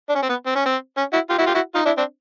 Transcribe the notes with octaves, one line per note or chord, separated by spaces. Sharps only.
D4
C#4
C4
B3
C4
C#4
C4
C#4
E4 F#4
F4 G4
E4 F#4
F4 G4
E4 F#4
D#4 F4
D4 E4
C4 D4